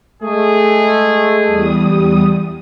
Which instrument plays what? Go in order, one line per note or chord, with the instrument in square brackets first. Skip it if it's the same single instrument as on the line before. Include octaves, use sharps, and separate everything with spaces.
[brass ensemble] G#3 A3 G#4
[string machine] E2 G3 D#6